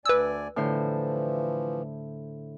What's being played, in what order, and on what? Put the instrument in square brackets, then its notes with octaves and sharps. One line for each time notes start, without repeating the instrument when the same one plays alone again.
[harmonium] D2 D5 G#5 [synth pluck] B4 E6
[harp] A2 D3 C5 [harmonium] E3 F3